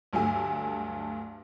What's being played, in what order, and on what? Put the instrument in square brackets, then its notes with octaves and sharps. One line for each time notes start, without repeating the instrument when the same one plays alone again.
[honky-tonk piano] D2 G2 F#3 A3 G#5 E6